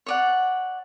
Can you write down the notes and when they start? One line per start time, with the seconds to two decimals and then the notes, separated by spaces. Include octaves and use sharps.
0.06 C#5 D5 F#5